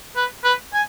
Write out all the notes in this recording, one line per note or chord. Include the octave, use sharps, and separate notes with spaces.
B4
B4
G#5